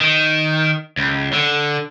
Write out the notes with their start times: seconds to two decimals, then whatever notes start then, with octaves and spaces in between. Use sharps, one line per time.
0.01 D#3
0.97 C#2
1.33 D3